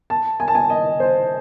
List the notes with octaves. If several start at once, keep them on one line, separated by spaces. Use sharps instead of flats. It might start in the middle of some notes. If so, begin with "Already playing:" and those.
A5
G#5
A5
G#5
D#5
C5